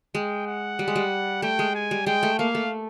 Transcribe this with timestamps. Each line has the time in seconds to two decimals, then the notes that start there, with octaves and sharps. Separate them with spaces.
0.15 G#3 G5
0.47 F#5
0.79 G3
0.88 G#3
0.96 G3
1.42 A3 G5
1.59 G#3
1.75 G#5
1.91 G3
2.06 G#3 G5
2.23 A3
2.39 A#3 F5
2.55 A3